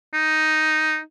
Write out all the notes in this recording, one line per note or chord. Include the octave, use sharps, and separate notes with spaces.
D#4